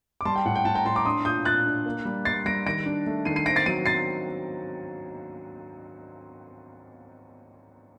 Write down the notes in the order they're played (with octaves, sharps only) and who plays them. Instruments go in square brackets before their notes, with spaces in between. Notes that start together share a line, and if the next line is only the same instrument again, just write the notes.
[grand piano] D6
G3 A5 C6
G5
A2 F#5
G5
A2 F#5 A5
G5 A#5
A2 A5 C6
A#5 D6
D4 C6 D#6
A#2 D#6 G6
A#2 F#6 A6
D4
A#3
G3
G3 A6 C7
G3 A#6 D7
D#3 A#6 D7
D4
A3
D#3 C7 D#7
C7 D#7
C4 A#6 D7
A6 C7
F#3 C7 D#7
C4 A6 C7